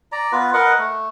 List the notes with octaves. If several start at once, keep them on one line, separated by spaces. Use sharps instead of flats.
D5 A#5
B3 F4 B4
A#4 B4 D#5 F#5
A3